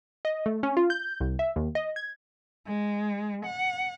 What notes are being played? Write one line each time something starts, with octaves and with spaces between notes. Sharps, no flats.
D#5
A3
C#4
F4
G6
C2
E5
D#2
D#5
G#6
G#3
F#5